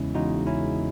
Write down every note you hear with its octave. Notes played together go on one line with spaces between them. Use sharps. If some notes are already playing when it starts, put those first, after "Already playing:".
Already playing: E2 C#3 G#3 C#4 E4
E2 C#3 G#3 D#4 F#4
C#4 E4